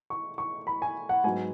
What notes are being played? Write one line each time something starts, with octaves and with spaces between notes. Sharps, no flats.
C#6
C#6
B5
G#5
F#5
G#2 F#3 B3 G#5